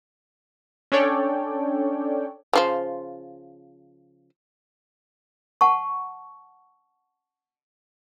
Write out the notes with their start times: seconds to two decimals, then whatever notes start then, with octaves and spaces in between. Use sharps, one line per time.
0.92 C#4 D4 A4 C#5 D5 G5
2.53 C#3 F3 C5
5.61 F#5 A5 C#6